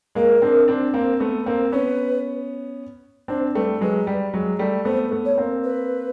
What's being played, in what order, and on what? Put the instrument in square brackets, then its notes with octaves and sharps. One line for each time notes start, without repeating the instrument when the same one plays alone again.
[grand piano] G#3 A#3 [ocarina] A#4
[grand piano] C4 D4
C4 D4
A#3 C4
A3 B3
A#3 C4
[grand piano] B3 C#4 [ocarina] B4
[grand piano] C4 D4 [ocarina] C5
[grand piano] G3 A3 [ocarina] B4
[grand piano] F#3 G#3 [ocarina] B4
[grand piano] G3
F#3 G#3
G3 A3
[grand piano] A3 B3 [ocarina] C5
[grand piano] A3 B3
[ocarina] C#5
[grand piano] A#3 C4
[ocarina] B4